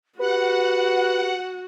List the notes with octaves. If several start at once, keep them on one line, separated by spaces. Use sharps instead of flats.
F#4 G4 B4 F#5